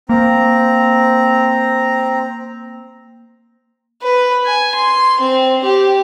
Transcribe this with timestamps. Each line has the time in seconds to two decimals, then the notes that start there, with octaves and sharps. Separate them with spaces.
0.09 A#3 C4 A#5
4.01 B4
4.46 G#5
4.75 C6
5.20 C4
5.64 G4